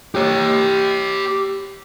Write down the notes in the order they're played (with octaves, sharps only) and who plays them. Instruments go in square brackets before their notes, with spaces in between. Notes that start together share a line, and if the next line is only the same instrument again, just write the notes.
[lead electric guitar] G4 C#5